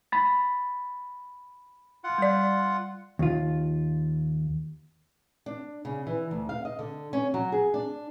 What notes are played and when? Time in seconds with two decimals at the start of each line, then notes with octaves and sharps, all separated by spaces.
0.12 B5 A6
2.04 F4 F#5
2.18 G3 D5
3.19 D#2 F4
5.46 D4
5.85 C#3
6.07 E3
6.31 D2
6.49 F5
6.65 D#5
6.79 D3
7.13 C#4
7.34 F#3
7.52 G#4
7.74 D4